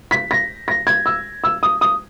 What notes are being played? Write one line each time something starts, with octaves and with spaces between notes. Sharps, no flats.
B6
A#6
A#6
G#6
E6
E6
D#6
D#6